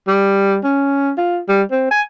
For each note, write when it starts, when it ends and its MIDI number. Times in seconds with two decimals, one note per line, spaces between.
0.08 0.59 55
0.64 1.12 61
1.17 1.39 65
1.49 1.63 55
1.72 1.90 60
1.91 2.02 80